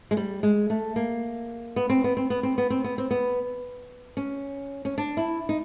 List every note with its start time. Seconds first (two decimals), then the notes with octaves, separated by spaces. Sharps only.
0.11 G#3
0.17 G3
0.43 G#3
0.70 A3
0.96 A#3
1.76 B3
1.90 C4
2.04 B3
2.17 C4
2.30 B3
2.43 C4
2.58 B3
2.70 C4
2.84 B3
2.98 C4
3.11 B3
4.17 C#4
4.85 C#4
4.98 D4
5.17 E4
5.49 D#4